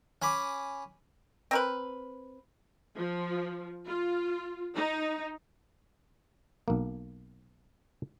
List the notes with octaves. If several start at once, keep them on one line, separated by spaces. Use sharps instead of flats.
C#4 G#5 B5 D6
C4 A#4 B4
F3
F4
D#4
B1 A#3